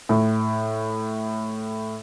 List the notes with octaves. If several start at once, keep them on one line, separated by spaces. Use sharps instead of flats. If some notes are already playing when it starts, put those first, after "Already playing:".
A2